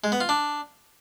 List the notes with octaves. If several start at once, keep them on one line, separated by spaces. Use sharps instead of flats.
G#3
B3
F4
D4